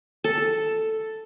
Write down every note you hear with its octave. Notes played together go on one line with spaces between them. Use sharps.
A4